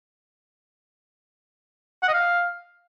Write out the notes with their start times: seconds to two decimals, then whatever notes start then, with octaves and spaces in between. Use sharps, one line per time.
2.03 F#5
2.08 D#5
2.14 F5